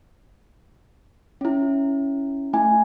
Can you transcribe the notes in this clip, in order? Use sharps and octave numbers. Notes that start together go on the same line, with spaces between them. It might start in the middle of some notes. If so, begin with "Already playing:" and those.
C#4 E4
A3 E4 G#5